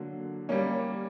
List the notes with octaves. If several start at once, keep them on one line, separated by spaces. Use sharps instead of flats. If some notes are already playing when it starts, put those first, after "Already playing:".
Already playing: D3 F#3 A#3
G3 A#3 C#4